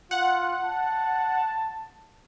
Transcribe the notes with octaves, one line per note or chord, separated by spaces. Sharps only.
F4 F#5
A5